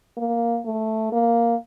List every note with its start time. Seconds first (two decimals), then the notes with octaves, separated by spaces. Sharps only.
0.17 A#3
0.65 A3
1.12 A#3